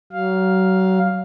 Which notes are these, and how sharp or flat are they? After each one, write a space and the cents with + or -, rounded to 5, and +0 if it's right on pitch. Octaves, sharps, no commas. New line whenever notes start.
F#3 +30 F5 +5